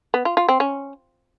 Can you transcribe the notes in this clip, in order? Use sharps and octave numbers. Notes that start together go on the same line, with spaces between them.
B3
F4
F4
C4
C#4